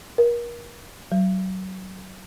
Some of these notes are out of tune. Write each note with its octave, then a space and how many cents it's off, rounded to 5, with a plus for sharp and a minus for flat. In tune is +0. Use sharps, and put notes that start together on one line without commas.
A#4 +35
F#3 +25